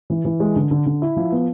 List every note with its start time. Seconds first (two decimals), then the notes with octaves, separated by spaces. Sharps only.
0.10 E3
0.25 E3
0.40 G#3
0.56 D3
0.71 D3
0.86 D3
1.02 E4
1.16 F3
1.32 B3